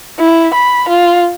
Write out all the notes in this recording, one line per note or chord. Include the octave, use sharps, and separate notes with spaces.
E4
B5
F4